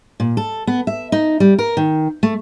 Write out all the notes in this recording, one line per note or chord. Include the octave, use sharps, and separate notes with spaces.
A#2
A4
B3
E5
D#4
G3
A#4
D#3
A3